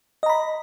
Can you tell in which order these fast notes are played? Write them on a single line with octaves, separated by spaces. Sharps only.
D#5 A#5 B5